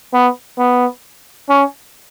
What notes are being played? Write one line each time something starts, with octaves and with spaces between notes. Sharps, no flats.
B3
B3
C#4